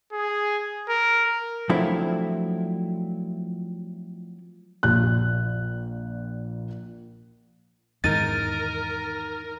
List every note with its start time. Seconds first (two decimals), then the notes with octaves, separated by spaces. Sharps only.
0.13 G#4
0.89 A#4
1.69 F3 F#3 A3 C4 D4 E4
4.83 A#1 A#2 F#6
8.04 E2 G#2 D#3 D#4 A#4 A6 D#7